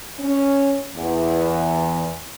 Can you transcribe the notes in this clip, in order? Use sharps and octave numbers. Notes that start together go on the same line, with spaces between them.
C#4
E2